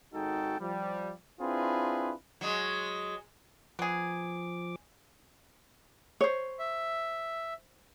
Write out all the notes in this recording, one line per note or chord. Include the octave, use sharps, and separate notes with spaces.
G#1 G#3 D#4 F#4 A4 G5
F3 G3
C4 D4 E4 F4 G#4 B4
F#3 G#3
F3 B3 G#4 D6
C5 C#5
E5